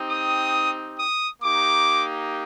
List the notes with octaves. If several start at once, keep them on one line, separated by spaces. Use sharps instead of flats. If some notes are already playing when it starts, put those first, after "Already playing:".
Already playing: C4 D#4 G4
D#6
D#6
A#3 D#4 G4 D6